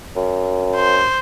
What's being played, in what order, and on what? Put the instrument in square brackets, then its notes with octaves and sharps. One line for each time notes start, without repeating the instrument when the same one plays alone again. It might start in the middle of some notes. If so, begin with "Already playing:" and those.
[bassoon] F#2
[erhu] C5